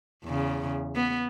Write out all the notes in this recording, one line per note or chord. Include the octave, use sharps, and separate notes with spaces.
E2 C#3
B3